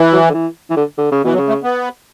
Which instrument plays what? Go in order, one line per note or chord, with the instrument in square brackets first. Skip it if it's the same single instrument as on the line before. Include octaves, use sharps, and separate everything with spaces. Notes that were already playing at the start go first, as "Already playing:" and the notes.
Already playing: [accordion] E3
[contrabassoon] F#3
D3
E3
E3
D3
D3
C#3
[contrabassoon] B2 [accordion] E3
[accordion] F#3
[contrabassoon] C#3
[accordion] A3
B3